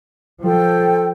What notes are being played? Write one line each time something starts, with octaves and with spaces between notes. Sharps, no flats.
F3 A4 G5